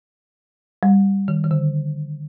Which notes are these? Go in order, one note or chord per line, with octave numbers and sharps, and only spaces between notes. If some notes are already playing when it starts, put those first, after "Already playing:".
G3
D#3
D#3
D3